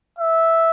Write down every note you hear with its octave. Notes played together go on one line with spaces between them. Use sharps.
E5